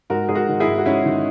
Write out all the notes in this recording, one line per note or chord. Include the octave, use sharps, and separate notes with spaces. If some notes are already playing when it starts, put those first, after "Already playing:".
G#2 F#4 A#4
G#2 G#4
F#4 A#4
D#3
E4 G#4
G#2
F#4
G#2 C#4 E4
D#3